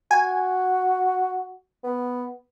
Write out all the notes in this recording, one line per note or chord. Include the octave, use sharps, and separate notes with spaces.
F#4 G#5
B3